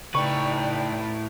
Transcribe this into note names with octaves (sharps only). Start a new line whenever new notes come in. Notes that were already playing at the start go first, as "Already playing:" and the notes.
A2 C#3 D#4 B4 D5 G5 C#6